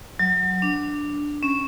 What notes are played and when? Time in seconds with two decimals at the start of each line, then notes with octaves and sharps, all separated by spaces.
0.19 F#3
0.62 D4
1.43 C#4